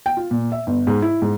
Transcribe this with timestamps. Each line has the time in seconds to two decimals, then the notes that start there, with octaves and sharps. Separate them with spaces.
0.06 G5
0.17 F4
0.31 A#2
0.52 E5
0.67 G1
0.87 G#2
1.02 E4
1.22 G#2